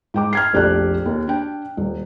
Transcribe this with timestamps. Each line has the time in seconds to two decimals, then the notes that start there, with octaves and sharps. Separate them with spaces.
0.14 G#2 G5 D6
0.33 F6 G#6 C7
0.53 F1 A#1 G4 A4 D5 F#6
1.06 D#2
1.28 D4 G5
1.77 D#1